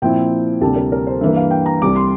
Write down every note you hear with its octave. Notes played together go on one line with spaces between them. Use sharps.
A#2 F3 C4 E4 G5
D2 C3 G3 A#3 A5
A#4
A#4
C5
G2 E3 A#3 E5
F5
G5
A#5
C2 C3 G3 D6
C6